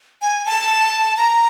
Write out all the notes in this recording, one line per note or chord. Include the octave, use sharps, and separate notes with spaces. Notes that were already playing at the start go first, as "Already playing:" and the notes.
G#5
A5
A#5